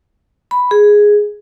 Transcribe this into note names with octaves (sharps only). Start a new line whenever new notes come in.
B5
G#4